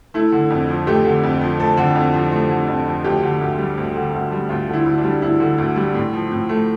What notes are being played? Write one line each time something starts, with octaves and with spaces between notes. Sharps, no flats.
A3 E4
D3
F2
F3
A3 G4
D3
F2
F3
A3 A4
D3
F2
F3
A3
D3
F2
F3
D2 G4
D3
D2
G3
D2
D3
D2
G3
D2 F4
D3
E4
D2
D4
G3
D2 E4
D3
D2
G3
A2
F3
A2
A3